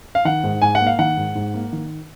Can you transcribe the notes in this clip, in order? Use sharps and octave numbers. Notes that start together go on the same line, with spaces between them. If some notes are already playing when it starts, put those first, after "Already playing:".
F5
D#3 F#5
G#2
G#2 G#5
F#5
A#3
F5
D#3 F#5
G#2
G#2
A#3
D#3